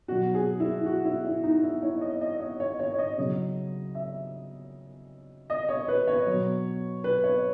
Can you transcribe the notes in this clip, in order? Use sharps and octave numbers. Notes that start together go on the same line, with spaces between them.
B2 F#3 F#4
G#4
E4
F#4
E4
E4
D#4
E4
C#5
D#5
D#5
C#5
C#5
C#5
C#5
D#5
C#3 F#3
E5
D#5
C#5
B4
C#5
B2 F#3
B4
C#5